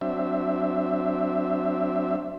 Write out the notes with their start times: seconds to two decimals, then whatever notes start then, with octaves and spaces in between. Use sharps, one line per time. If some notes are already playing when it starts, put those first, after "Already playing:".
0.01 F#3 C4 D4 E5